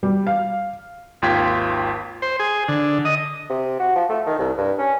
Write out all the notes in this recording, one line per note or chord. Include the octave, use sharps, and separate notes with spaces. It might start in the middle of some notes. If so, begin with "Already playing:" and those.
G3
F5
G#1 D#2 F4 G5 G#6 B6
C5
G#4
D3
D#5
C3
F#4
F3
A3
D#3
C2
G2
C#4